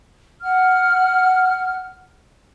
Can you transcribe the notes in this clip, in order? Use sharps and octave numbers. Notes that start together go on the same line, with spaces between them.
F#5 F6